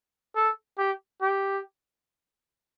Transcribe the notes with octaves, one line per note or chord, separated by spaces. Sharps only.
A4
G4
G4